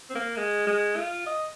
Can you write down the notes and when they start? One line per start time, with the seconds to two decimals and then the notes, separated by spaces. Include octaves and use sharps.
0.10 C4
0.15 A#3
0.37 G#3
0.67 G#3
0.96 F4
1.26 D#5